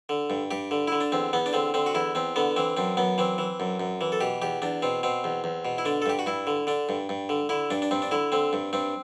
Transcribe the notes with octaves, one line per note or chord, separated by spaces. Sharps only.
D3
G2
G2 G4
D3
D3 E4
D4
E2 C4
E2 B3
D4
D3 C4
D3 C4
F#4
E2 E4
E2 C4
D3 B3
E3 C4
F#2 C4
F#2 B3
E3 C4
E3
F#2
F#2
E3
A4
B2 G4
E2 G4
E2 D4
B2 C4
B2 C4
E2
E2
B2
E4
D3 D4
A4
G2 G4
F#4
G2 E4
D3
D3 D4
G2
G2
D3
D3 E4
G2 D4
D4
G2 C4
D4
D3 E4
D3 C4
G2
G2 C4